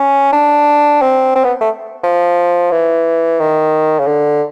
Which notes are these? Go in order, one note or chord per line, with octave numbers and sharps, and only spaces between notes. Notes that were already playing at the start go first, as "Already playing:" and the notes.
Already playing: C#4
D4
C4
C4
B3
A3
F3
E3
D#3
C#3
D3